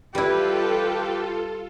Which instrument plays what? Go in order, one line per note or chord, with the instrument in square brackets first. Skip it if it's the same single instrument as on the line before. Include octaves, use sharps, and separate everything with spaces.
[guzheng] G3 E4 [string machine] F4 A4 [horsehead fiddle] G4 B4